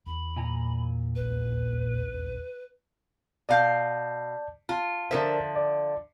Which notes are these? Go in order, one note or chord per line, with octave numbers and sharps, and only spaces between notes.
E2 B5
A#2 G#5 A#5
E1 A#1 D#2 B4
B2 D5 F5 A5 G6
F4 A5
D3 F3 D4 A#4 C5 E5
D5